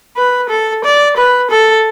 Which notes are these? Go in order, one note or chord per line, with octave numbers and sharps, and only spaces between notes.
B4
A4
D5
B4
A4